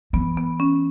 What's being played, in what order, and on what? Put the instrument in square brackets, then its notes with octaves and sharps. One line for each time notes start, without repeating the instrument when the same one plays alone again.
[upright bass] E3 [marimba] B3
[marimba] B3
C#4